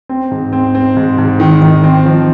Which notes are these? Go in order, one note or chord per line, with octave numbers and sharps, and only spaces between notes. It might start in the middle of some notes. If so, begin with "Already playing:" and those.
C4
G#2
C4
C4
G#2
G#2
D#3
D#3
C4
F3